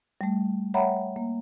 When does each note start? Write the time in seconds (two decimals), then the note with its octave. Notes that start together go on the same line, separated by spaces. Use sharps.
0.21 G3 A3
0.74 C#5 E5 F#5 G5 A#5 B5
1.16 A#3